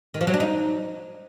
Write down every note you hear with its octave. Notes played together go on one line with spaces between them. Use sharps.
D#3
F3
F#3
D4
D#4